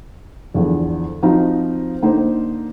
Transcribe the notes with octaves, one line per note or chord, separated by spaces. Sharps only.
E2 D3 F3
F3 C4 D#4 F4 F#4
D3 A#3 D#4 C5